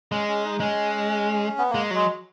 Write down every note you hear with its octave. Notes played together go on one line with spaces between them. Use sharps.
G#3 C#4
C#4
D#4
G#3 C#4
B3
G#3 A#3
F#3 G#3